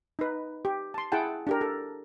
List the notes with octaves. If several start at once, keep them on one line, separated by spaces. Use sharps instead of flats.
D#4 B4
G4
A5 C6
E4 G#4 F#5 G5 A5
D4 G4 A#4
A4